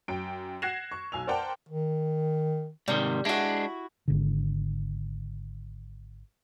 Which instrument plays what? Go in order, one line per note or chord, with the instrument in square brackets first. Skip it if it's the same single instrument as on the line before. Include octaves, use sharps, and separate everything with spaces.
[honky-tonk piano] F#2 G5 D7
F#5 F#6 G#6 A#6 C7 E7
C#6
B1 G#5 E6 F7
A#4 C5 D5 F#5 G5 A5
[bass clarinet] D#3
[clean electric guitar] G#2 C3 D#3 [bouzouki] G3
[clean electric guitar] G#3 D4 [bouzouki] E4 F#4
[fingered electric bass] G#1 D3